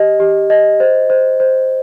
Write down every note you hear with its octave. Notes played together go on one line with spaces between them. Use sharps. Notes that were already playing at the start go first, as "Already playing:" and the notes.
Already playing: G4 D#5
G4
D#5
C5
C5
C5